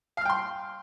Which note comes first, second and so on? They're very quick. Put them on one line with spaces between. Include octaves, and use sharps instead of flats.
F5 F6 G5 C6